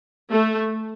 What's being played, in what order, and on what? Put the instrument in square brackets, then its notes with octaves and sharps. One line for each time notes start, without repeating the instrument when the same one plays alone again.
[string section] A3